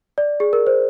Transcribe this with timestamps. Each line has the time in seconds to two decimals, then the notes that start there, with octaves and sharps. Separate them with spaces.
0.18 D5
0.40 G#4
0.53 A#4
0.67 C5